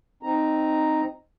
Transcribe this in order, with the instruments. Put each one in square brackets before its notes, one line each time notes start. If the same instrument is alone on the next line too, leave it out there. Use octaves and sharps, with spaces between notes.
[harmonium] C4 D#4 A#5